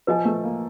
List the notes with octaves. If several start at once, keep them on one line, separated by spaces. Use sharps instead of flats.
F3 B4 D#5 G#5
A3
A#3